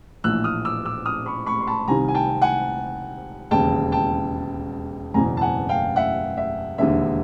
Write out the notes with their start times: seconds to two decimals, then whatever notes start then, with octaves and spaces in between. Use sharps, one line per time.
0.24 A#1 A2 E3 E6 F#6
0.44 D#6 F6
0.65 D6 E6
0.85 D6 E6
1.06 D#6 F6
1.26 B5 C#6
1.46 B5 C#6
1.61 C6
1.67 A5 B5
1.87 C2 C3 D#3 G#5 A#5
2.08 G#5
2.15 G5 A5
2.42 F#5 G#5
3.51 E1 D#2 C#3 G5 A5
3.92 G5 A5
5.14 F#1 E2 B2 G#5 A#5
5.37 A5
5.41 F#5 G#5
5.69 F5 G5
5.96 E5 F#5
6.37 E5
6.78 E1 D#2 D3 E5